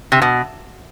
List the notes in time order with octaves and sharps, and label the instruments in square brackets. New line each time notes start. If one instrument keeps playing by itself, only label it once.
[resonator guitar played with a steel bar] C3
B2